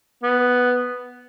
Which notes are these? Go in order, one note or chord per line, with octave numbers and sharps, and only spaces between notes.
B3